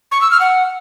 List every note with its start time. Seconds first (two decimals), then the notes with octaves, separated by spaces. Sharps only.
0.12 C#6
0.21 E6
0.31 F6
0.41 F#5